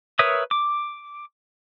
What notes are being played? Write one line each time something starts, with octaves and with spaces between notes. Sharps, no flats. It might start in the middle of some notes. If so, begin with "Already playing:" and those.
A#4 B4 C#5 E5 D#6
D6